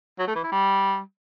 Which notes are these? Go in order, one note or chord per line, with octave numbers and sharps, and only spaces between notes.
F#3
A3
E3
E4
G3